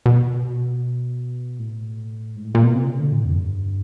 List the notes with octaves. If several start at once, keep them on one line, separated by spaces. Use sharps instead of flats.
B2
A2
G#2
A2
A#2
B2
C3
C#3
D3
A2
F2
G2